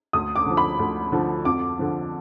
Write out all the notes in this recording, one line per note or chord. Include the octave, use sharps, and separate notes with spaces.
D2 D#6
D6
D3 F3
B5
D2
D3 F3
F2 D6
D3 F3